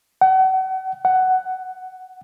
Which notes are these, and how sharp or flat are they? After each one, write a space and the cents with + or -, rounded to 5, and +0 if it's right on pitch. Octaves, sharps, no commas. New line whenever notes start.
F#5 +35
F#5 +10